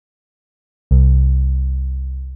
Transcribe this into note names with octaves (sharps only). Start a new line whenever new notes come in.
C2